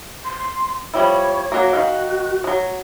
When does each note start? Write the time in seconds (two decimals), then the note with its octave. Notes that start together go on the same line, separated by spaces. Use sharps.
0.25 C6
0.94 F3 G3 E4 C#5
1.52 F#3 A#3 F#4
1.73 D#3 F5
2.44 F3 F#3